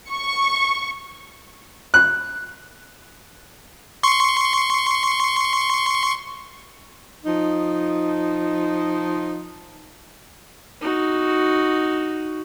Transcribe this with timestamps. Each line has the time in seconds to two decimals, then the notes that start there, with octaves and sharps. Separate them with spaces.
0.10 C#6
1.94 F#6
4.03 C6 C#6
7.25 F3 D#4
10.81 D#4 F#4